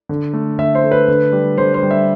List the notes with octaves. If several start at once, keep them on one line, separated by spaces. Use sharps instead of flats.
D3
A3
D3 E5
C5
A3
B4
D3
G3
D3 C5
C5
G3
E5